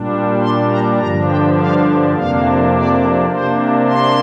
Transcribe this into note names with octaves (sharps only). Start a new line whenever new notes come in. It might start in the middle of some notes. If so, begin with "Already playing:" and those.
Already playing: A#2 G3 D4
C6
A#5
G2 D3 F3 D4 A#5
G5
F5
F2 C3 A#3 D4 F5
D5
C3 A#3 D4 C5
C6